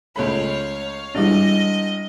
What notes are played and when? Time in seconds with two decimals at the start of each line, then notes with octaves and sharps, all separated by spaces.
0.16 C#2 A3 C#5 F5 B5
1.15 G#1 E3 G3 D4 D#5